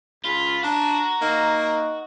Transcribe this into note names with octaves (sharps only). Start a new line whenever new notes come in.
C#2 F4 B5
D4 F#4 A#5
A#3 D#4